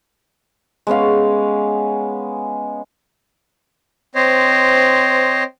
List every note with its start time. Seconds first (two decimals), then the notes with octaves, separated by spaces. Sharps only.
0.87 G#3 B3 C#4 F5
4.15 C4 C5 C#5 D#5